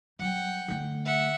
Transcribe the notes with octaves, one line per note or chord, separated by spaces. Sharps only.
F#3 G3 F#5 G5
D3 A3
E5 F#5